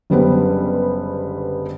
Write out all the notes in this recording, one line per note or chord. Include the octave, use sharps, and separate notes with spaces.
F#1 D3 G3 B3 B4 C5